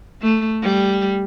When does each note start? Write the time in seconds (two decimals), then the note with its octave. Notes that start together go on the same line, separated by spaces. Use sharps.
0.22 A3
0.63 G3